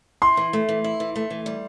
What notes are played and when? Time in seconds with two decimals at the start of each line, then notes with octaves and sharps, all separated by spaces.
0.22 E4 C6
0.37 E3
0.53 A3
0.69 E3
0.84 E4
1.00 E3
1.16 A3
1.30 E3
1.46 G3